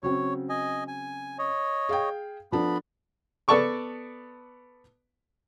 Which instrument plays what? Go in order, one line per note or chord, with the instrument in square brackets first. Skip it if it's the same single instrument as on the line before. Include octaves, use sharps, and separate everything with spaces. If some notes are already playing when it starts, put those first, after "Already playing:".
[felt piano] C#3 F#3 C4 [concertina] C#5
[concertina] D#5 G#5
G#5
C#5 D#5
[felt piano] G#4 F5 G5
[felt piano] F3 D4 A4 [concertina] B3 B5
[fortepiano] B3 A4 D5 A5 C#6 D6